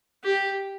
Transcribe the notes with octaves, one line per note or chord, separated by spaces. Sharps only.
G4